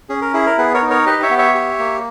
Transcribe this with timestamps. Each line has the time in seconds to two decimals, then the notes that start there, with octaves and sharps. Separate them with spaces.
0.09 C#4 G#4
0.21 A#4
0.34 E4 G#4
0.46 A#4
0.58 B3 G#4 B4
0.74 A#4 C#5
0.82 D#4
0.90 A#4 C#5
1.06 G4 B4 D#5
1.23 C#5 E5
1.30 B3
1.38 C#5 E5
1.55 G4
1.79 A#3